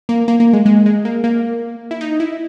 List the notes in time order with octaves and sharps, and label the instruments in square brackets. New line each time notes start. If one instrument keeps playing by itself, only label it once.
[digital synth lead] A#3
A#3
A#3
G#3
G#3
G#3
A#3
A#3
E4
D#4
E4